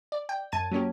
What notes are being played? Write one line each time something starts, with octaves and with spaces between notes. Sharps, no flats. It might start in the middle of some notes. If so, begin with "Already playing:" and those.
D5
G5
F#2 A5 G#6 D#7
F#3 A#3 C#4 G4